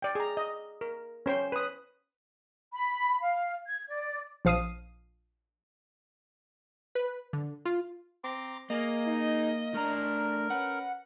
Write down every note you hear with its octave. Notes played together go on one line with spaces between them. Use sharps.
D5 G5
G#4 A#5
D#5
A#4
C#4 C5 G5 C6
B4 D#6
B5
F5
G#6
D5
A#1 F3 F5 D#6 C7 D#7
B4
D3
F4
C4 A#5 C6 D6
A#3 G#4 D#5
D#4
A2 D4 A#4 A#5
C#4 B4 F#5